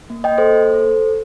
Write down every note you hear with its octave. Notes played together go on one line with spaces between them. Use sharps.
A#3
D#5 G5
A#3
A4 C5
A#3
A4